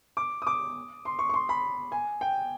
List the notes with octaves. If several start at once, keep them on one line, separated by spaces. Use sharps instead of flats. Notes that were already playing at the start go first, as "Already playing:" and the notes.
D6
D#6
D6
C6
C#6
C#6
C6
B5
G#5
G5